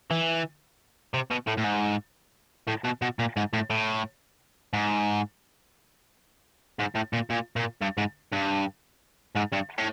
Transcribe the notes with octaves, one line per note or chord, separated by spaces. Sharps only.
E3
C3
B2
A2
A2
G#2
A2
B2
B2
A#2
G#2
A2
A2
G#2
G#2
A2
A#2
A#2
A#2
G2
G#2
G2
G#2
G2
A2